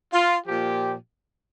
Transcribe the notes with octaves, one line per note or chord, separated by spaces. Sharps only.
F4
A#2 F3 G4